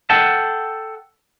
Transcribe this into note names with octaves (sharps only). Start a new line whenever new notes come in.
A4 F#5 G5 A5